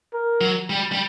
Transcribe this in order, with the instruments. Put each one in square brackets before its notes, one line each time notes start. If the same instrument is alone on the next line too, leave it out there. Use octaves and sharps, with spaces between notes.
[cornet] A#4
[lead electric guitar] F#3
G3
G3